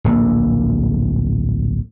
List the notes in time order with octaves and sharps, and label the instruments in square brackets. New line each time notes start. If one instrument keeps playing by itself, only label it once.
[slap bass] D1 A#1 A2 A#3